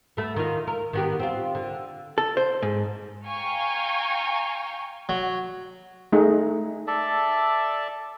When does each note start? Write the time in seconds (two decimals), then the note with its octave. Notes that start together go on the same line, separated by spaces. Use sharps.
0.17 A3 B3
0.36 D#3 F4
0.67 A#4
0.93 D#3 B3 G4
1.19 C4 F4
1.55 D3
2.18 A4
2.37 C5
2.62 G#2
3.28 F5 G5 G#5 A#5 C#6
5.09 F#3
6.12 A3 D#4 G#4
6.87 A4 D5 E5 A5